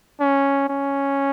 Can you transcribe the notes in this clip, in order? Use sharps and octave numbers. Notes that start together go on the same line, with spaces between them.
C#4
C#4